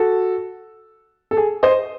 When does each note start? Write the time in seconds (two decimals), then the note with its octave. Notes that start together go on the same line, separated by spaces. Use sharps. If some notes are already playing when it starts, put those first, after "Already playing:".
Already playing: F#4 A4
1.31 A4
1.37 G#4
1.63 C5 D#5